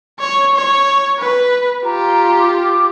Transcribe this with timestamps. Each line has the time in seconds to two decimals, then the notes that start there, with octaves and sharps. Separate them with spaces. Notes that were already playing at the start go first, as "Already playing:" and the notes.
0.20 C#5
0.55 C#5
1.19 B4
1.84 F4 G4 A#5
2.38 D6